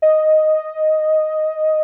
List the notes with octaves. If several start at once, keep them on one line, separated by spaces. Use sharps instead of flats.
D#5